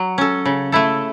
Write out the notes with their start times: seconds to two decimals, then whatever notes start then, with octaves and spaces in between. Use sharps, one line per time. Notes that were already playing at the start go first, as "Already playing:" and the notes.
Already playing: F#3
0.18 C#4 A4
0.45 C#3
0.72 A3 E4 A4